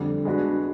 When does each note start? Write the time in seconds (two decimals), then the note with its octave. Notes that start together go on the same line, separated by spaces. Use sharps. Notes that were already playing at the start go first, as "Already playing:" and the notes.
Already playing: F2 D3 G3
0.25 G#3 B3 D4 F#4 B4